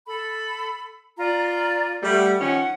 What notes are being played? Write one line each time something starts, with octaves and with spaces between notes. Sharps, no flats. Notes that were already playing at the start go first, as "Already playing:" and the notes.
A4 B5
F4 D5 A#5
G3 A3 F#5 G5
D#3 F3 C#4 F#5